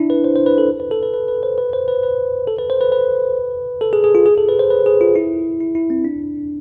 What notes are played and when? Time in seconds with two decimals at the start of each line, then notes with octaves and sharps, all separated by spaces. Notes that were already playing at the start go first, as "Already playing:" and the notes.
Already playing: D4 E4
0.10 B4
0.24 C5
0.36 C5
0.46 B4
0.58 A4
0.80 B4
0.91 A4
1.03 B4
1.14 B4
1.28 B4
1.43 C5
1.58 B4
1.73 C5
1.88 B4
2.03 B4
2.47 A4
2.58 B4
2.70 C5
2.81 B4
2.92 B4
3.81 A4
3.93 G#4
4.04 G#4
4.15 F4
4.26 G#4
4.38 A4
4.49 B4
4.59 C5
4.70 B4
4.86 G#4
5.01 F4
5.16 E4
5.61 E4
5.75 E4
5.90 C4
6.05 D4